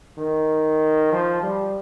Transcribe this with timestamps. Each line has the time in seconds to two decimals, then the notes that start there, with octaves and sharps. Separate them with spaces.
0.18 D#3
1.12 F3
1.43 G3